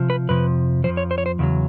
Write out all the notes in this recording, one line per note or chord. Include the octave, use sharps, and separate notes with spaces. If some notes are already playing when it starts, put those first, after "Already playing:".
Already playing: C3 F3
B4
F2 C3 F3 B4
F2 C3 F3 C5
C#5
C5
C#5
C5
E2 C#3 F#3